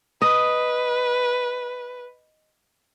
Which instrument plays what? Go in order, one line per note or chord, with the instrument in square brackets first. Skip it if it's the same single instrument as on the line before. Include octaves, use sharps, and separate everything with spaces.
[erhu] B4 [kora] D#5